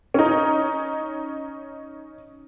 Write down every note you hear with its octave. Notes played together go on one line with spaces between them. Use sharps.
C#4 D#4